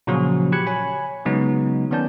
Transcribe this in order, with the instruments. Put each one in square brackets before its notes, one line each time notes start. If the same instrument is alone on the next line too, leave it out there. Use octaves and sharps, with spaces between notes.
[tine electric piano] A#2 C#3 F3 F#3 C#4 F#4
G4 B5 F#6 G#6 C#7
C#5 G#5 B5
C#3 F#3 G#3 B3 D#4
D#3 B3 C#4 D5 A5 G6